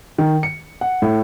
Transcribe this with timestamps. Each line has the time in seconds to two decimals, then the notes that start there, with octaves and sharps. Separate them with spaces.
0.18 D#3
0.43 C#7
0.81 F#5
1.02 A2